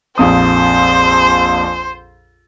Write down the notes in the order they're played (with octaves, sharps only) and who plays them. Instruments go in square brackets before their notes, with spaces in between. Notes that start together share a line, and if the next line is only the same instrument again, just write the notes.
[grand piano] A#1 F2 D#6 [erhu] C5